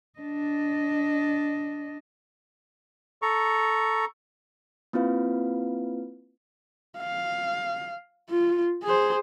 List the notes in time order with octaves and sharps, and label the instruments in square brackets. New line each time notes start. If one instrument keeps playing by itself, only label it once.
[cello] D4 D#5
[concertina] A4 A#5 C#6
[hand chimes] A#3 C4 E4 F4 B4 F5
[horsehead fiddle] F5
F4
G#4 C5